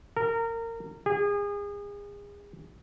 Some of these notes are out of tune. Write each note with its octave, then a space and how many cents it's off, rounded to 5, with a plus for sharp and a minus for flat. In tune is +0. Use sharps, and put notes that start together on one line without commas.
A#4 -25
G#4 -35